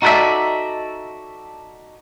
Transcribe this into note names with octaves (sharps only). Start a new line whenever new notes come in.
D#4 F#4 A4 B4 D5 E5